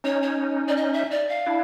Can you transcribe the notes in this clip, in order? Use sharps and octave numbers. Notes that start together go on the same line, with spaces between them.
C#4 D#4 C#5
C#5
D5
D#5
E5
D5
F5
D4 E4